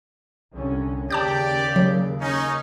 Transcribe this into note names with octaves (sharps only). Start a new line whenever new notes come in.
C2 D3 C#4
D#2 C#3 G4 D5 A5 D6 G6
F#3
C#4 D#4